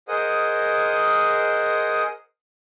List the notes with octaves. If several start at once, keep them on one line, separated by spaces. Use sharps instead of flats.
G#4 A#4 C5 D#5 F#5 D#6